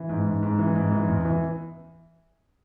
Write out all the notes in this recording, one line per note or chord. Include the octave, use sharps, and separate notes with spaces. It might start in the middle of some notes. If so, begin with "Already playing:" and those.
Already playing: E3
G#2
G#2
G#2
E3
G#2
E3
E2
E3